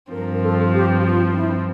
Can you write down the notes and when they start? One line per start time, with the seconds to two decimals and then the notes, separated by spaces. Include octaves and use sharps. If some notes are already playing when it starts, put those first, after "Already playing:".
0.12 G2 F3 C4 A#4
0.34 A#4
0.43 A4
0.65 F4
0.74 G4
1.00 G4
1.05 F4
1.30 D4
1.36 E4